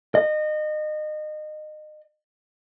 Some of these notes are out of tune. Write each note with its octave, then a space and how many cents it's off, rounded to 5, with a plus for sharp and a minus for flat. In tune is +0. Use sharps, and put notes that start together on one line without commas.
D#5 -30